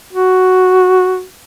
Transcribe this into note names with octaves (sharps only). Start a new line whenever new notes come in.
F#4